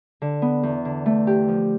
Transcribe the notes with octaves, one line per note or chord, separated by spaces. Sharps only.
D3
B3
E2
D3
A3
G4
F3